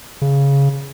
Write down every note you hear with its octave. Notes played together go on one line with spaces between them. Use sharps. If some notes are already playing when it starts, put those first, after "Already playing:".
C#3